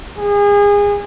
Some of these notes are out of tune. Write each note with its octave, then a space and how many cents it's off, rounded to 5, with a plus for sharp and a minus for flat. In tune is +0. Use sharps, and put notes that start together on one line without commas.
G#4 -30